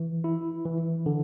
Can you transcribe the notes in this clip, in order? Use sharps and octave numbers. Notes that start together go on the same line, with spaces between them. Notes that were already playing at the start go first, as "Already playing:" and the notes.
Already playing: E3
E4
E3
D3